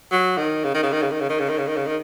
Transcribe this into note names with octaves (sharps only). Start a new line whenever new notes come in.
F#3
D#3
C#3
D#3
C#3
D#3
C#3
D#3
C#3
D#3
C#3
D#3
C#3
D#3
C#3
D#3